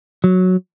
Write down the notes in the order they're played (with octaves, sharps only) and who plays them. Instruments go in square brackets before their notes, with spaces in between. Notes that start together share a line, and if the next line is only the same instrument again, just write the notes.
[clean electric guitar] F#3